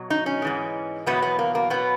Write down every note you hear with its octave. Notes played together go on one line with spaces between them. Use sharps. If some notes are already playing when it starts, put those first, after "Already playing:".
Already playing: B2 F#3
D#4
C#4
G#2 E3 G#3
E2 B2 F#3 B3
B3
A#3
A#3
B2 F#3 B3